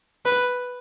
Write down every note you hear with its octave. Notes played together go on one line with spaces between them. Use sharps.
B4